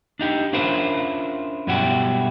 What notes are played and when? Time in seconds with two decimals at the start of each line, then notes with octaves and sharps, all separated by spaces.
0.19 D4 D#4 G4
0.53 C#4 D4 E4 F4 A#4 C5
1.67 G2 B2 F#3 E4 F#4 G4